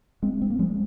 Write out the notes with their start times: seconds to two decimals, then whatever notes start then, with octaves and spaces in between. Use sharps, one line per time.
0.23 G#3 C4
0.42 C4
0.50 A#3
0.59 F3 G#3